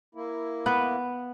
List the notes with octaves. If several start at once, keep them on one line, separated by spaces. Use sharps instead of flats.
A#3 E4
B3 B4